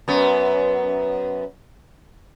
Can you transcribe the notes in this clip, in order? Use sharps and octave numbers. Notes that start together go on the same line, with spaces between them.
F#2 B3